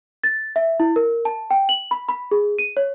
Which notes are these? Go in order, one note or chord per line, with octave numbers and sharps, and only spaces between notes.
A6
E5
E4
A#4
A5
G5
F#7
B5
B5
G#4
D#7
C#5